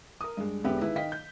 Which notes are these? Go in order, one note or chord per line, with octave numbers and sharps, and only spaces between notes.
A#4 D#6
G2 G#3
E1 D3 B3 G4 E5
C#2 D#3 E4 B4
D#3 D#5 F5 G5 B6
G6